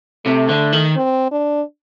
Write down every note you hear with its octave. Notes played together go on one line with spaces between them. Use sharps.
C3 A3
D3
D#3
C4
D4